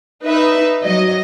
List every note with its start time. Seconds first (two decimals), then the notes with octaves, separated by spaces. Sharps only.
0.23 D#4 B4 E5
0.82 F#3 D#5